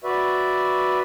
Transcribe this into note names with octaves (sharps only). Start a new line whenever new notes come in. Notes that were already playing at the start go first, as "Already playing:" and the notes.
F#4 B4 D5 E5